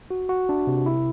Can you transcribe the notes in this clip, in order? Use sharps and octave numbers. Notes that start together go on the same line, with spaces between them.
F#4
F#4
D4
C3
E4